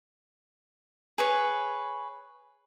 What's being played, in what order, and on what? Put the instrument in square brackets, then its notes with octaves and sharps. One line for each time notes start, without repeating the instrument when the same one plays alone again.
[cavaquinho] G#4 B4 C#5